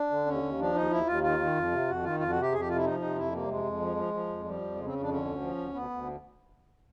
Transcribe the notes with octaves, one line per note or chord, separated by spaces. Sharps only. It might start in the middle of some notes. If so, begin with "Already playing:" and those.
Already playing: D4
D3
D#2 C#4
D#2
F3 D4
D#2 D#4
D#2 E4
D#2 F4
D#3 F4
D#3
F2
C3
F2 F#4
D#3 F4
F2 F4
F#4
C3
G4
F2 G#4
G4
C3 F4
E4
F3 D#4
C3 D#4
F2 E4
C3 A#3
G3
F2 G#3
F2
F3
F3
F3
F2
F3 G3
F2
C#3 G#3
C4
F2 C#4
D4
D3 C#4
D2
F3
D2
D2 B3
D2